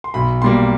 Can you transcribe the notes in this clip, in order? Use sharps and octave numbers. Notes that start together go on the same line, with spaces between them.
C6
B1 B5
B2 G3 A#3 C6